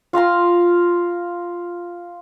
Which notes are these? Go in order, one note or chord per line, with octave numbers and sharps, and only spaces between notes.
F4 F5 A#5 C6